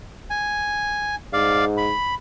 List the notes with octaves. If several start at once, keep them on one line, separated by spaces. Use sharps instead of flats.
G#5
G#2 D5 F5
B5